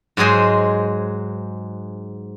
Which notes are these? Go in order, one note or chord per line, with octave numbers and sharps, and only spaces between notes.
G#2 F#3 G#3 G#4 C5